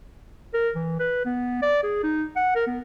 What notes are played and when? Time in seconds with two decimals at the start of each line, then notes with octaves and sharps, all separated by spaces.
0.54 A#4
0.76 E3
0.99 B4
1.25 B3
1.62 D5
1.83 G#4
2.03 D#4
2.36 F#5
2.55 A#4
2.67 B3